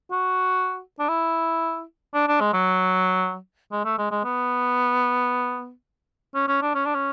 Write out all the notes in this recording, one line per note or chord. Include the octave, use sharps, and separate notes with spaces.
F#4
D4
E4
D4
D4
G#3
F#3
G#3
A3
G#3
G#3
B3
C#4
C#4
D4
C#4
D4
C#4